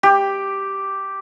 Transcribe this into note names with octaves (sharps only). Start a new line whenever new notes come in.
G4